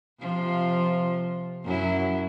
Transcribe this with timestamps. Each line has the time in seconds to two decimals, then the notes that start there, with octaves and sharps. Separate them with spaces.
0.20 C3 F3 F4
1.65 F#2 F#3 E4